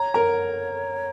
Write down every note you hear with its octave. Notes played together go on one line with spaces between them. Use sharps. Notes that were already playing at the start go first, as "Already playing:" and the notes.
Already playing: C#5 A#5
A#4 A#5